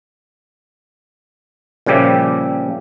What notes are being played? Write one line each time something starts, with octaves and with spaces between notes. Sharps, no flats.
A#2 C#3 F3 G3 G4 E5